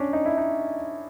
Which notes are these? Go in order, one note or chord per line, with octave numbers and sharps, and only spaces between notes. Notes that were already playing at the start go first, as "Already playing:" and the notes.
Already playing: C#4 D4
D#4
E4
D#4